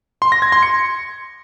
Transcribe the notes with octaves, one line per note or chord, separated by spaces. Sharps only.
C6
A#6
G#6
C6
C#7